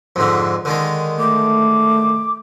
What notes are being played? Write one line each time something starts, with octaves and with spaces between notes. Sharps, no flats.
F2 G#2 D3
D3 D#3 G#3
A3 D6